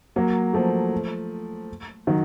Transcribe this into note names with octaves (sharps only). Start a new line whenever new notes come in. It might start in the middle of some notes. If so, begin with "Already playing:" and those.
F#3 A#3
F3 A3
D#3 F#3